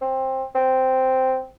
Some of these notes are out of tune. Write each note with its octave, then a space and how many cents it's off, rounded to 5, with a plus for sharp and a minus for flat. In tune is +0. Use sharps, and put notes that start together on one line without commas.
C4 +15
C4 -5